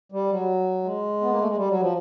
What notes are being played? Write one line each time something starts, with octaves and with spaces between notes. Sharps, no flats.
G3
F#3
G#3
B3
A#3
A3
G#3
G3
F#3
F3